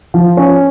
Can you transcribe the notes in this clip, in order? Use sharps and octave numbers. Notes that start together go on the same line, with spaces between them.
F3
C#4